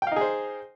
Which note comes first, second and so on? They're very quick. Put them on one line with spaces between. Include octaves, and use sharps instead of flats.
G5 F5 D#4 G#4 C5